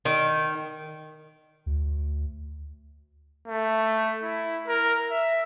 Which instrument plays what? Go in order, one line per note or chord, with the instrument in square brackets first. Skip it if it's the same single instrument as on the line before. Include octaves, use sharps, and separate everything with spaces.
[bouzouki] D#3
[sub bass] D2
[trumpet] A3
E4
A#4
E5